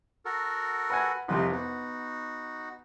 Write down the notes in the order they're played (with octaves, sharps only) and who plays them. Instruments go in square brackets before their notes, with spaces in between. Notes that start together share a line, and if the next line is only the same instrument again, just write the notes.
[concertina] F#4 A4 A#4
[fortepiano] B4 F#5 G#5
[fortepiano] C2 F2 C3 [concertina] D#4 B4 D#5
[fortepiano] B3 [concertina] D#4 F#4